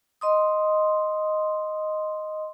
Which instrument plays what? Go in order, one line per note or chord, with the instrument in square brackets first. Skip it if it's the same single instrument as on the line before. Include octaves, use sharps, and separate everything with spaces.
[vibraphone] D#5 C6 D#6